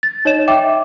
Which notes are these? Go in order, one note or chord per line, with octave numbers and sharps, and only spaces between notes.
A6
D#4 C#5 D#5 E7
E5 G5 D6